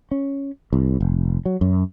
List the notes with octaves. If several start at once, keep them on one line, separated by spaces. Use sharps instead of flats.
C#4
C2
F1
F#3
F#2